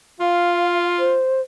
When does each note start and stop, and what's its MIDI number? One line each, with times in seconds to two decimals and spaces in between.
0.20 1.20 65
0.20 0.86 77
0.99 1.41 72